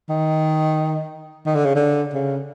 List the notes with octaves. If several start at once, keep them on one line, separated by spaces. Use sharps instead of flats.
D#3
D#3
D3
C#3
D3
C#3